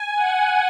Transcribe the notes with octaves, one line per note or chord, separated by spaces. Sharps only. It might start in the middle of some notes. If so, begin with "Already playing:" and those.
Already playing: G#5
F#5